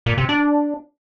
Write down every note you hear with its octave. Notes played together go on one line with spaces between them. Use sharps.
A#2
C3
D4